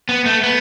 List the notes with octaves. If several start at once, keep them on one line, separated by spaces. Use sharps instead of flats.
B3
A3
B3